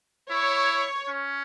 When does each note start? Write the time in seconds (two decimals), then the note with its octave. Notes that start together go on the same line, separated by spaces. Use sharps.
0.30 E4 C#5
1.08 C#4